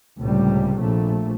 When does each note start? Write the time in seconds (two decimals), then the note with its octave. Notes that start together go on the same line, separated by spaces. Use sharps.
0.19 C#2 A2 C3 G3
0.78 A#1 A3